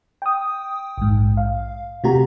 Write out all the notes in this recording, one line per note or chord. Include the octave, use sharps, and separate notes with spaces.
G5 D#6
A#1 G#2
F5
C3 A3 F#4 G4 A#5